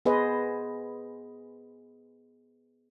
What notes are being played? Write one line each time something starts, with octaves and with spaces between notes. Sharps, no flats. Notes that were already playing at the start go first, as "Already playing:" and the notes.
B3 G#4 B4 C5 D#5